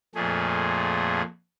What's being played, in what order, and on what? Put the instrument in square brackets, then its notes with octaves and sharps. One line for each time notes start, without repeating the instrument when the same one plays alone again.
[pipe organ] F2 A#2 A3 G#4